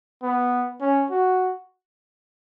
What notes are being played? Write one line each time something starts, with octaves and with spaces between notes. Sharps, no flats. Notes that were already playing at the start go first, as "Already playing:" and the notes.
B3
C#4
F#4